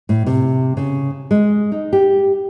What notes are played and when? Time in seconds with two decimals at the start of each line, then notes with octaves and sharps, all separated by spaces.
0.09 A2
0.26 C3
0.77 C#3
1.31 G#3
1.72 D#4
1.93 G4